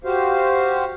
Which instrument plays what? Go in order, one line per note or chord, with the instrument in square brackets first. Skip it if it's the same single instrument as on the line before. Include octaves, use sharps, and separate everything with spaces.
[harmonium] F#4 G4 C5 F5